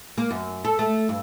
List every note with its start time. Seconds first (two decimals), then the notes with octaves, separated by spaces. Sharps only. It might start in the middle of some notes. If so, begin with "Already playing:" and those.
0.18 A#3
0.31 F#2
0.65 A4
0.79 A3
1.09 G2